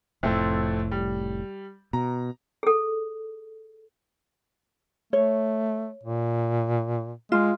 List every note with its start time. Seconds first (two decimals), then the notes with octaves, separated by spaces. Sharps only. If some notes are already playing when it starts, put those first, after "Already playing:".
0.23 F1 F2 A2 A3 C4
0.91 G3
1.93 B2 A#5
2.63 G#4 A4
5.13 A3 C#5
6.03 A#2
7.32 G#3 F4